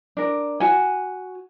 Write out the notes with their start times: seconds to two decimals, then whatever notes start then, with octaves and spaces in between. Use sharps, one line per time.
0.17 D4 A#4
0.60 F#4 G#5